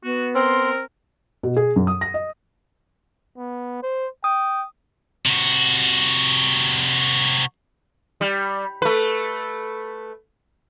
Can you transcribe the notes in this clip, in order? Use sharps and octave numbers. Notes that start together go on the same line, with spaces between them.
B3 F#4
C4 A#4 C6
B2
G#4
F#2
D#6
A#6
D#5
B3
C5
G5 D#6
C3 F#4
G3
A3 B4